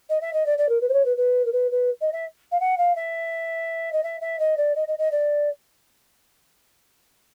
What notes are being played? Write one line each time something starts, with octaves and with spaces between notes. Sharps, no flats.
D#5
E5
D#5
D5
D5
A#4
B4
C5
C#5
B4
B4
A#4
B4
B4
D#5
E5
F5
F#5
F5
E5
D#5
E5
E5
D#5
D5
D#5
D#5
D#5
D5